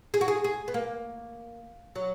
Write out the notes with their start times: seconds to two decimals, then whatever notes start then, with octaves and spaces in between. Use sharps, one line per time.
0.14 G#4
0.21 F#4
0.28 G#4
0.44 G#4
0.68 B3
0.74 A#3
1.95 F#3